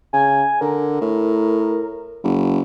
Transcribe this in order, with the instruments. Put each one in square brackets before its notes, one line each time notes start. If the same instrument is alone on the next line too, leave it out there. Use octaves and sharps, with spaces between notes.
[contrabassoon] C#3 [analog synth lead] G#5
[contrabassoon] D3 [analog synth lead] A#4
[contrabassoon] A2
F#1